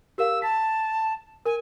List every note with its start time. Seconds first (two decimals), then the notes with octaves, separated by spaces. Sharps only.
0.18 G4 A#4 F5 E6
0.42 A5 B6
1.45 A#4 G#5